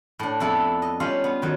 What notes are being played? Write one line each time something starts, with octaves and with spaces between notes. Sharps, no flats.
A2 D4
F2 B3 E4 A4
D#5
G3 C#4 F4 F5
B3
D#3 F#3